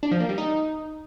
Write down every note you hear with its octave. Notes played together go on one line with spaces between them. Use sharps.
D4
F3
A#3
G3
D#4